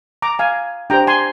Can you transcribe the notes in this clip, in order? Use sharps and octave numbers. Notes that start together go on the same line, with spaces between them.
A#5 D6
F5 G#5
D4 G4 C5 G5 A#5
G#5 C6